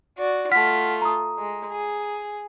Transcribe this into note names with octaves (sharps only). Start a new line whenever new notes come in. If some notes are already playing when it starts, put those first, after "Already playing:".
F#4 D5
A3 F4 F#5 F6 B6
A#5 D#6
G#3
G#4